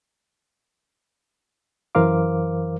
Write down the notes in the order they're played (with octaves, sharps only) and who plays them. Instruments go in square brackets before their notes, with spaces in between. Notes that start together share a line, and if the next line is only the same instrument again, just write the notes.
[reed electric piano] F#2 E3 A#4 C5 F5 D6